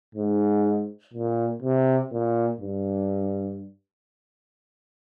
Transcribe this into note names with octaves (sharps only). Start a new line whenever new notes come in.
G#2
A#2
C3
A#2
G2